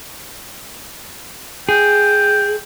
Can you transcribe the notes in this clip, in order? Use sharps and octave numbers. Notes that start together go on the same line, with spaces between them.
G#4 G5